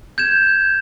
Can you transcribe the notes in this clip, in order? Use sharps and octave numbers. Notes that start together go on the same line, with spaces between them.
G6 G#6 E7